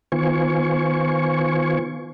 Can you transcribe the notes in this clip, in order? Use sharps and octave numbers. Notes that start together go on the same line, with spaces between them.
D#3 B3 F4 C5 G#5 C#6